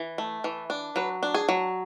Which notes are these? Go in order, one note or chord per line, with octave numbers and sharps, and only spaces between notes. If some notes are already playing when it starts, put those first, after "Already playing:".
Already playing: E3
A3
E3
D4
F#3 B4
D4
G#4
F#3